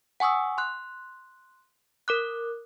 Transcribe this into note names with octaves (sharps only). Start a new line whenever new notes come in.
F#5 G#5 C#6 D#6 E6
C6 F#6
A#4 D6 F#6